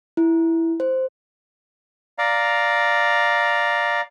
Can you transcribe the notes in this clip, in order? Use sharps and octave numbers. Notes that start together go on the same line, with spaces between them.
E4
C5
D5 F5 A#5